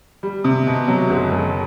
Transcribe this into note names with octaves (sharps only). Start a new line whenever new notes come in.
G3
C3
B2
F#3
F#1
F#1